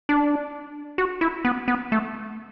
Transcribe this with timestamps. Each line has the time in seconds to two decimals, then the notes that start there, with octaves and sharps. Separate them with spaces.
0.09 D4
0.98 F#4
1.21 E4
1.45 B3
1.68 B3
1.92 A3